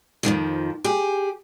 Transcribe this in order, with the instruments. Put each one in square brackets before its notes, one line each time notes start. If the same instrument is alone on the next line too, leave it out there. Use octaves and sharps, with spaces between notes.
[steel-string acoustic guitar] F2 B2 D#3 F3
G4 G#4